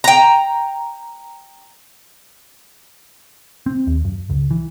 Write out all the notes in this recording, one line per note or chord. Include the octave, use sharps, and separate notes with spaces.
G5 A#5
C4
D#2
F#2
C#2
E3